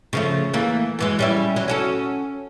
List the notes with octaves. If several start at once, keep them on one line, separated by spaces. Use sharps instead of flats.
C#3 F3 A3
E3 A3 A#3
F#2 E3 G#3
G3 C#4 E4
F#3
C#4 F#4 A4